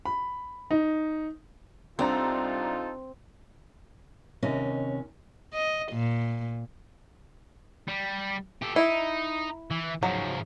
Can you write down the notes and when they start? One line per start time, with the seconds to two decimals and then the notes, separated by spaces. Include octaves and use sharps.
0.05 B5
0.71 D#4
1.99 C2 C4 D4 D#4 F4 A4 A#5
4.43 D#2 C3 C#4 D#5
5.54 D#5
5.92 A#2
7.88 G3
8.63 G4 A4
8.76 D#4 E4
9.71 E3
10.03 G#2 F3 F#3